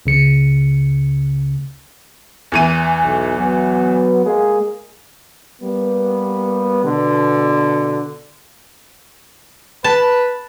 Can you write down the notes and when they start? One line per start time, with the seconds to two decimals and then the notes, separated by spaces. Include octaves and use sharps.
0.06 C#2 C#3 C#7
2.52 E2 E3 D#7
3.03 B1
3.37 F#3 B3
4.26 G#3 A#3 G#4
5.62 G3 A#3 B3
6.84 B2 D3
9.84 B4 A5